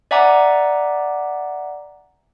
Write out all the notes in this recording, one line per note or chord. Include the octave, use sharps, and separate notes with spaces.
D5 E5 F#5 G#5 A#5 D6